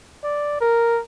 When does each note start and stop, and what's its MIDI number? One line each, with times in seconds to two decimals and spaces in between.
0.23 0.56 74
0.61 1.01 70